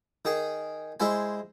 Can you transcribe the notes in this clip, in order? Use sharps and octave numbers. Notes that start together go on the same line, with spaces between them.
D#3 G#4
G#3 E4 C5 G#5